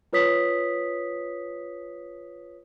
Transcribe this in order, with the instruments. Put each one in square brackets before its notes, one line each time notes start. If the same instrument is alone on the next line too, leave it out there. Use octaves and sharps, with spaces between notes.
[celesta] F4 B4 C#5 D#6 B6